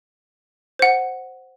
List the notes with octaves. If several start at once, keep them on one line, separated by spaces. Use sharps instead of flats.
C5 F#5